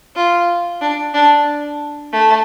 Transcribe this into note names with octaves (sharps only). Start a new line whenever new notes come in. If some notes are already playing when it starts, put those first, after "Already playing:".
F4
D4
D4
A3